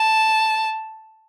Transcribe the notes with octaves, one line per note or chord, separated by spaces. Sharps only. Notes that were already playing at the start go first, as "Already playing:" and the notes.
Already playing: A5